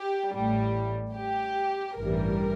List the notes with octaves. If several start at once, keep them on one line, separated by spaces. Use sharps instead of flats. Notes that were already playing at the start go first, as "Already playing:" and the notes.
Already playing: G4
A1 A2 G3
G4
A1 G2 E3 G3 A#4